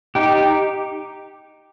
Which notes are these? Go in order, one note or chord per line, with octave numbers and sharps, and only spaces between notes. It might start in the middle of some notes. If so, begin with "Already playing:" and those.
D#4 G4